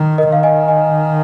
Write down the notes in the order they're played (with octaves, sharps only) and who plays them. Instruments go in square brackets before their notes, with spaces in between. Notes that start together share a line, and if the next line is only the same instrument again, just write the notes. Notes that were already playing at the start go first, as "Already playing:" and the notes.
Already playing: [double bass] D#3
[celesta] A#4 D#5
[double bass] D#3 [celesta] F5
[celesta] D#5 G#5
D#5 G#5